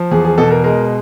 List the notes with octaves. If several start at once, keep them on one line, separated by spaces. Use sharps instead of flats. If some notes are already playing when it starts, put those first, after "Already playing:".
Already playing: F3
E2 G#4
G#4
B2 A4
A#4
G#3 A#4